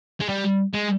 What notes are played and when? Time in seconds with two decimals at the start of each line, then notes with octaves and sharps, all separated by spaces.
0.20 G#3
0.29 G3
0.73 G#3